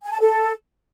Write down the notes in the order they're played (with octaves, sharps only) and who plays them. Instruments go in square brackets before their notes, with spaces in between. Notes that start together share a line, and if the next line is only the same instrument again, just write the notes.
[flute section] G#5
A5
A4